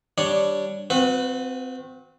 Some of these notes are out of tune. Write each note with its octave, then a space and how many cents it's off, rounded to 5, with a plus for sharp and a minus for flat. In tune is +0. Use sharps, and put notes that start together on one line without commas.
G3 +0 D4 +0 C#5 +0
C4 -20 F#4 -35 B4 +15